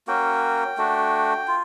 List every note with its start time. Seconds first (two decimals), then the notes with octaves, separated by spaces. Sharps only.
0.07 A#3 C#4 F#4 G5
0.78 A3 D4 F#4
1.48 F4